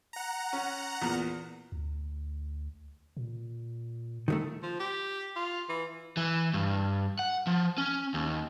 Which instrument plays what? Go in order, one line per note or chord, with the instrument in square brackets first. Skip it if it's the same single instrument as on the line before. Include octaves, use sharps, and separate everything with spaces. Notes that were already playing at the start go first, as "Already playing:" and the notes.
[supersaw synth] F#5 A#5
[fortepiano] C#4
E2 A#2
[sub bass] D2
A#2
[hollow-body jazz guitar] D#3 F#3 A3
[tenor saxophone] F3
G4
F4
E3
[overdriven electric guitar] E3
G2
F#5
F3
C#4
D#2